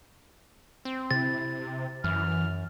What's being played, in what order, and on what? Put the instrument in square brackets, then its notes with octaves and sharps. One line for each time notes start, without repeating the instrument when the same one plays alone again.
[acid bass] C4
[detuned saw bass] C3 [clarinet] E4 [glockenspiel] A6
[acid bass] F#2 [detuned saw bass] E3 [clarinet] F6